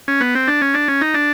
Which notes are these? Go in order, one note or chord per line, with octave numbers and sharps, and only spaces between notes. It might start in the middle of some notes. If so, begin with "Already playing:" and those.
C#4
B3
C4
D4
C#4
D4
C#4
D#4
D4